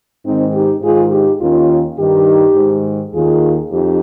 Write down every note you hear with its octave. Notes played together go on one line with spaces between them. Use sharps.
G#2 D#3 C4 D#4
D#4 G4
G#2 D#3 F4 G#4
D#4 G4
D#2 D#3 C#4 F4
G2 D#3 D#4 G4
G#2 D#3
D#2 D#3 F4 G#4
F2 D#4 G4